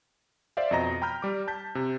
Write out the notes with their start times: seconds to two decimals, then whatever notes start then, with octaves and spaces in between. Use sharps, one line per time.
0.57 C5 D5 E5 F5
0.71 F2 B2 D#5 A#5 A#6
1.02 G5 A#5 B5 F6 G6
1.22 G3 D6
1.48 A5 G6 B6
1.75 C3